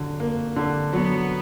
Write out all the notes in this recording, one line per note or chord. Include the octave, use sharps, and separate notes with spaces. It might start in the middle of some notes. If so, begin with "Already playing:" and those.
Already playing: D3 F#3
A#3
D3
F#3 B3